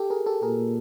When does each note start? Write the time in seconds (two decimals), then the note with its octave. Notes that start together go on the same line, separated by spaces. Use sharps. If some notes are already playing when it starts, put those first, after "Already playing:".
Already playing: G4 A4
0.10 G#4 A#4
0.26 G4 A4
0.42 A#2 G#4 A#4